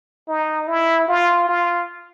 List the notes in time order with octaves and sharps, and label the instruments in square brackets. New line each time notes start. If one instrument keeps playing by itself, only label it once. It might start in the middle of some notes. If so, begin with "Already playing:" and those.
[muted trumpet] D#4
E4
F4
F4